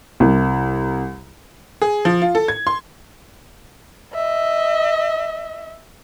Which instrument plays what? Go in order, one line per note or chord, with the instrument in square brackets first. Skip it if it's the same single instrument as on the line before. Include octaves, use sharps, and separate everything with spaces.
[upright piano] C2
[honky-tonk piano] G#4
F3
F4
A4
G#6
C6
[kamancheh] D#5 E5